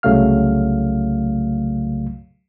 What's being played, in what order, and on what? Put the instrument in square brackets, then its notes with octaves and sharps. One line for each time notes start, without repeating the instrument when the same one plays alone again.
[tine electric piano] C2 C#3 F#3 A3 F5 F6